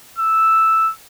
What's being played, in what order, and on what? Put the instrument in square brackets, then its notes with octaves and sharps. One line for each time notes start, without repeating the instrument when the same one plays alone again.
[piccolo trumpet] E6